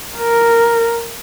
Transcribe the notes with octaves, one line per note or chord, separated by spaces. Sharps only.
A#4